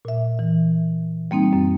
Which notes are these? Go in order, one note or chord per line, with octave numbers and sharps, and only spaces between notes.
A#2 E5
E3
G3 A#3 C4 D#4
F#2 C4